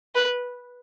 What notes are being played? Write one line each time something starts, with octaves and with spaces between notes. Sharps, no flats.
B4